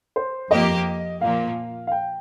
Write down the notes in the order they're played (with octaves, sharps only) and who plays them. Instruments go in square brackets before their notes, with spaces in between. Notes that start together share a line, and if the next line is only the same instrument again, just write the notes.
[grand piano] C5
[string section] F2 F3 A#3 G4 [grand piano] D#5
[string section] A#2 F3 A#3 [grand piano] F5
[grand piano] F5
G5